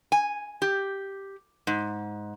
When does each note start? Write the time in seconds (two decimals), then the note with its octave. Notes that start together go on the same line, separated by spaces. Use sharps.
0.12 G#5
0.62 G4
1.67 G#2